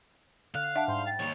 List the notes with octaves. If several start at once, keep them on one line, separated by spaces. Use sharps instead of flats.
D3 F5 F#6
D4 E5 F#5 A5
G#2 G3 C6
G5 A6
D#2 C#5